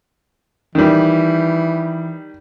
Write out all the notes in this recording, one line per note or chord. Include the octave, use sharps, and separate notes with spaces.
D#3 E3 G3